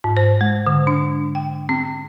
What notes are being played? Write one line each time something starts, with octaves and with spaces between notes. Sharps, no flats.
G#2
C5
G#3
D3
D4
G5
C4